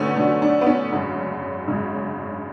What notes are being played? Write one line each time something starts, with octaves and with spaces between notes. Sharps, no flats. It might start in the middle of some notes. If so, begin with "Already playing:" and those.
Already playing: D2 D3 F#3 A3 B3 C#4
D2 D3 F#3 D4
D4
B3
C#4
G#1 F#2 C#3 F#3
G#1 F#2 C#3 F#3